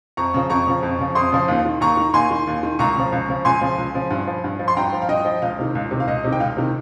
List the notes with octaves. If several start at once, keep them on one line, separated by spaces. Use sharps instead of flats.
F2 A#5 C#6
C#3 F3
F2 A#5 C#6
C#3 F3
F2
C#3 F3
F2 C6 D#6
C#3 F3
D#2
D#3
D#2 A#5 C#6
D#3
D#2 G#5 C6
D#3
D#2
D#3
C#2 A#5 C#6
C#3 F3
C#2
C#3 F3
C#2 G#5 C6
C#3 F3
C#2
C#3 F3
G2
F3
G2
F3
C6
G2 G5 A#5
F3
F5
G2 D#5 G5
F3
C#2 F5
C3 D#3
C#2
C3 D#3
F5
C#2 D#5
C3 D#3
G5
C#2 F5
C3 D#3